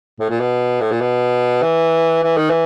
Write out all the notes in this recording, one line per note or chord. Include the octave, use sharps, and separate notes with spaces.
A2
A#2
B2
A2
A#2
B2
E3
E3
D#3
E3